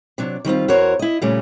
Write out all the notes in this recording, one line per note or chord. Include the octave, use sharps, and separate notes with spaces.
C3 F#3 D4
D#3 G3 C4 F4
E2 F#4 A#4 C5 C#5
E4 D#5
A#2 C#3 G3 A3 C#4